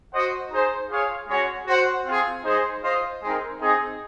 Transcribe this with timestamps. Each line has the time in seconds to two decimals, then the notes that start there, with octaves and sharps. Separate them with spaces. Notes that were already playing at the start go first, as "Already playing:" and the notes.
0.12 F#4 C5 D#5 F#5
0.51 D#4 G#4 C5
0.90 F4 G#4 C#5 F5
1.28 G#3 C#4 F#4 C#5
1.67 F#4 C5 F#5
2.05 C4 F4 G#4
2.44 G#3 D#4 G#4 C5
2.83 F4 C5 D#5
3.22 G#3 C4 D#4 A#4
3.60 C4 D#4 G#4 D#5